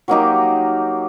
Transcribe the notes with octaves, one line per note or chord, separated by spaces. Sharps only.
F#3 A#3 D#4 G4